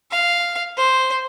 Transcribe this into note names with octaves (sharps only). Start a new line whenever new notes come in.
F5
C5